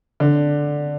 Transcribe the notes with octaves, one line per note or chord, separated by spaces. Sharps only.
D3